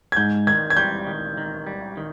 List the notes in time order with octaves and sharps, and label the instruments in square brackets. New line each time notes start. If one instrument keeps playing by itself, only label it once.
[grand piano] G#6
[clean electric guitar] G#2 [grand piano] G6
[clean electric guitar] D#3 [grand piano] G#6
[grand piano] G#6
[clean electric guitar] G3 [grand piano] G6
[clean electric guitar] D#3
D#3
G3
D#3